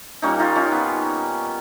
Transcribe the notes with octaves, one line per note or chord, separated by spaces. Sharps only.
A#2 G3 A#3 C#4 D#4
D#4 F4
C#4 D#4
B3